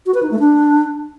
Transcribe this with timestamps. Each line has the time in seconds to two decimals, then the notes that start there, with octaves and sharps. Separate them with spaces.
0.06 F#4
0.14 B4
0.23 D#4
0.31 A3
0.39 D4